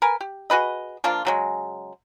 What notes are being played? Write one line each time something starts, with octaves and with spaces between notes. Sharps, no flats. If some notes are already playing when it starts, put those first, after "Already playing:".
A#4 B4 G#5
G4
F#4 G#4 B4 D#5
F3 A#3 D4 F4
C#3 F#3 G#3